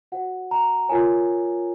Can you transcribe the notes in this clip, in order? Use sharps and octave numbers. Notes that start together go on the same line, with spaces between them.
F#4 C5 F#5
A#5
F4 A#4 C#5 G#5